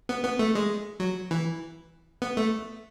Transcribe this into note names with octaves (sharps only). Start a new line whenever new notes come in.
B3
B3
A3
G#3
F#3
E3
B3
A3